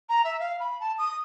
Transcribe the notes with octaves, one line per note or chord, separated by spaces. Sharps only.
A#5
E5
F5
B5
A5
D#6